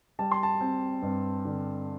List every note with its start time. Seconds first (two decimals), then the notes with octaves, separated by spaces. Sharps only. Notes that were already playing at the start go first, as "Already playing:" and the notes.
0.19 G3 A5
0.32 C6
0.43 A5
0.61 C4
1.02 G2
1.45 D3